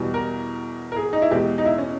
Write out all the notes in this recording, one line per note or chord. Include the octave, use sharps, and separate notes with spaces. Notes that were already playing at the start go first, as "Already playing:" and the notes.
Already playing: E2 B2 G3
A#4
A#4
G#4
D#4
E4
E2 B2 G#3 G4
D#4
E4
C#4